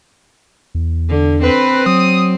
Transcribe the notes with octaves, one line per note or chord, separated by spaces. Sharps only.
E2
D3
C4 B4
F#3 D#6